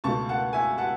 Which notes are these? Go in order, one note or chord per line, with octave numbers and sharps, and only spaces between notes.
C#2 B2 A3 D#4 A5 C#6
F#5 A5
E5 G#5
F#5 A5